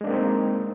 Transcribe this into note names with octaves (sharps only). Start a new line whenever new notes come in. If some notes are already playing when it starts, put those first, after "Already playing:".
G#3 A#3 C4 D4 D#4